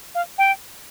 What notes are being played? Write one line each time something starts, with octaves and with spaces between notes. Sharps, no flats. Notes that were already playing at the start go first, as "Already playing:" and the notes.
F5
G5